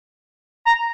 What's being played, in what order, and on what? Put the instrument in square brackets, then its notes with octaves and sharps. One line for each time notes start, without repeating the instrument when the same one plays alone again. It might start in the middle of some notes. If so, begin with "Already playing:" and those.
[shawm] A#5